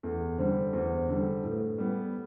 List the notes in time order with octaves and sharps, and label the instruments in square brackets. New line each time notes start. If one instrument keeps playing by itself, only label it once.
[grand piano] E2 [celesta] A4
[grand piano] D3 G3 [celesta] C5
[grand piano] E2 [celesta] C5
[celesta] C5
[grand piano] D3 G3
[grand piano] A2 [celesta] A4
[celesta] B4
A4
[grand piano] G3 B3